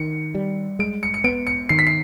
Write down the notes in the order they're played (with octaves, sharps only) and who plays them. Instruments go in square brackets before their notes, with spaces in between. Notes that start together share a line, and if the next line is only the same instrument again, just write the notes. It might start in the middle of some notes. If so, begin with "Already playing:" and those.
Already playing: [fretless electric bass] D#3 [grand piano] C#7
[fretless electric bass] G3
[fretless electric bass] G#3 [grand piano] D7
[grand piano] C#7
C#7
[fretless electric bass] B3 [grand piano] D7
[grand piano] C#7
[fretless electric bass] D#3 [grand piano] C7
[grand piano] B6
C7